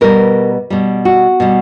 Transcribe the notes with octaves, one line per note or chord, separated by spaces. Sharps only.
B2 G3 A#4
B2 G3
F#4
B2 G3